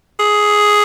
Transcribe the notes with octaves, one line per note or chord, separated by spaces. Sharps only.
G#4